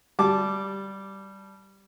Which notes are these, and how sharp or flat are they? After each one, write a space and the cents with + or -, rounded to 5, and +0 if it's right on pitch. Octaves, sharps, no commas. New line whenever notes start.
G3 -5 A5 -10 D6 -5